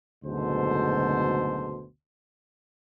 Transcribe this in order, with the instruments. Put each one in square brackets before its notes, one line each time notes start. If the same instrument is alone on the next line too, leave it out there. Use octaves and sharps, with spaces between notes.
[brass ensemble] F#1 D2 G#2 B2 A4 C5